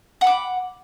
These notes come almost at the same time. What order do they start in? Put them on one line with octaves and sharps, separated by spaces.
F#5 B5 D6